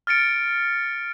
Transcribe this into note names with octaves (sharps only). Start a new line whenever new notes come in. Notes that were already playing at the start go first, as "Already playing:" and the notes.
F6 A6 C#7 D7